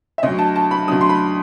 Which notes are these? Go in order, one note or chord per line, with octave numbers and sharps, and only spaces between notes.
E5
D2 D3 F#3 D#5
A5
A5
B5
D2 D3 F#3 D#6
C6
B5